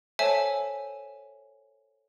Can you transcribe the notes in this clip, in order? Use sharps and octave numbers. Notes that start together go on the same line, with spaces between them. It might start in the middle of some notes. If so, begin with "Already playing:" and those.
A4 C5 C#5 E5 G#5 A5